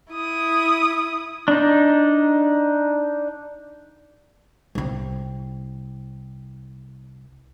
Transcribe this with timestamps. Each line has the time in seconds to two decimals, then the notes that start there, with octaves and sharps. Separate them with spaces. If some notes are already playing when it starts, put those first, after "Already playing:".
0.13 E4 D#6
1.48 D4 D#4
4.75 C2 C4